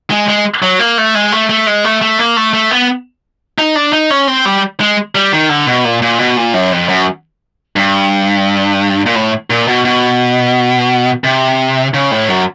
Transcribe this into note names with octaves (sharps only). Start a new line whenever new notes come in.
G#3
G#3
F#3
A#3
A3
G#3
A3
A3
G#3
A3
A3
A#3
A3
A3
B3
D#4
D4
D#4
C#4
C4
G3
G#3
G3
D#3
D3
B2
A#2
A#2
B2
A#2
F#2
F2
F#2
G2
A#2
A2
A#2
B2
B2
C3
C#3
A2
F#2